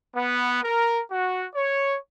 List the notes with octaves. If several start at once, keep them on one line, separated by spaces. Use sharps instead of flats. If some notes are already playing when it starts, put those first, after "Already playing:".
B3
A#4
F#4
C#5